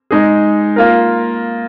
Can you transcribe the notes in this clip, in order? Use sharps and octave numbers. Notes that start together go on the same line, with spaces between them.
G#3 D#4 G#4
A#3 F4 A#4